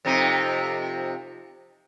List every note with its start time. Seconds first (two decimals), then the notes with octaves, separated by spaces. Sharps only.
0.05 F2 C3 D#4